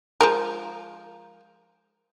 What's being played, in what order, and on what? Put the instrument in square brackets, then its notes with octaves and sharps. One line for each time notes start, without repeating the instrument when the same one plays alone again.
[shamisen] F3 G#3 A#4